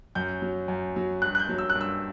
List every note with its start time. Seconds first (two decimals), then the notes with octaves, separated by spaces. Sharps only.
0.15 F#2 G6
0.42 F#3
0.68 F#2
0.96 F#3
1.22 G2 F#6
1.35 F#6
1.40 G6
1.49 F#3
1.58 E6
1.70 F#6
1.75 G2
1.81 E6